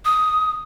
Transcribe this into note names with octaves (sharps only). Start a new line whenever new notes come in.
D#6